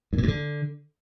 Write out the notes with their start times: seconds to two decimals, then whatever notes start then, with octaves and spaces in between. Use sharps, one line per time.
0.13 G2
0.18 A#2
0.23 G2
0.28 D3